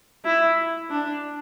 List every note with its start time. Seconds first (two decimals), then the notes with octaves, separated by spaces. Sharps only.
0.25 E4
0.90 D4